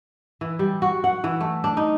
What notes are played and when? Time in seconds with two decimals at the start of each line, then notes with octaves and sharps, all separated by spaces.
0.41 E3
0.59 G3
0.82 F#4
1.04 F#5
1.24 E3
1.40 A3
1.64 D4
1.77 D#4